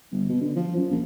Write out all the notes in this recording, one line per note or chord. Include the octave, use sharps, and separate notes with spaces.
G1
B2
D3
F3
F#2
A#1